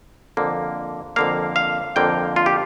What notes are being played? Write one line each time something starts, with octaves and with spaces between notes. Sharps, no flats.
F2 D3 A#3
F2 D3 A#3 F5
F5
F2 D3 A#3 G5
F4
G4